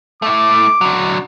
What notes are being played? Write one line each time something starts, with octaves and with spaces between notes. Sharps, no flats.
A3 E4 D6
D3 F#3